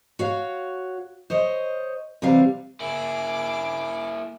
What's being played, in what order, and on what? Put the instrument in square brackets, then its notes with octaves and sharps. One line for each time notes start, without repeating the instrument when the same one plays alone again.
[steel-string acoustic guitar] F#4 C#5 F5
C5 C#5 D#5
C3 E3 G3 F5
[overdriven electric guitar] A#3 E4 [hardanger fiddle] G#4 D6